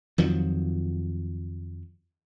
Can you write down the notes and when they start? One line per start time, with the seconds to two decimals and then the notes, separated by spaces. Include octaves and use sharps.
0.18 F2 D#3 F3 F#3